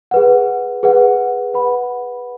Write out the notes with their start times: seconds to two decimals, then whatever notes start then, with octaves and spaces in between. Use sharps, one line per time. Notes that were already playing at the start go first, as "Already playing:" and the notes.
0.11 G#4 B4 F#5
0.83 G#4 B4 F#5
1.54 B4 F#5 B5